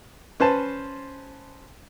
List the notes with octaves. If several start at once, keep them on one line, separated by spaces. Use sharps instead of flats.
C#4 B4 C5 A5